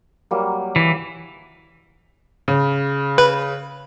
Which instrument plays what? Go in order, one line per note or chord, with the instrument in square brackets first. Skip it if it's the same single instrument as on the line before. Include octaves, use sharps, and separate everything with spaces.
[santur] F#3 G3 A#3
[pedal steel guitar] E3
[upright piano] C#3
[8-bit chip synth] B4